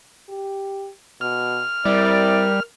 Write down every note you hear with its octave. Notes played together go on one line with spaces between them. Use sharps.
G4
B2 F6
G3 C4 E4 A#4 D5